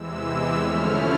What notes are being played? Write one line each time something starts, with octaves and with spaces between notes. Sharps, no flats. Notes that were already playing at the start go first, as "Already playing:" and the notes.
Already playing: E2 C3 E3 G#3 E6
D3 F3 A3 C#4 E4 F6